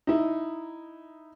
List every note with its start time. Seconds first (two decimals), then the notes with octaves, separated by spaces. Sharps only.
0.07 D#4 E4